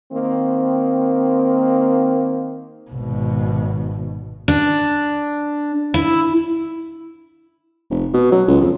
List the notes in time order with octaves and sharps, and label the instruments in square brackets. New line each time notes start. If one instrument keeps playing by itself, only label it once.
[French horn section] D#3 A#3 C4
[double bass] G#1 B2
[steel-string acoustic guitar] D4
E4
[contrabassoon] F1
B2
F#3
C#2
F2